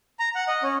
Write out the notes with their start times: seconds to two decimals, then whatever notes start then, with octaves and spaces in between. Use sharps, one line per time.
0.19 A#5
0.35 F#5
0.48 D#5
0.63 C#4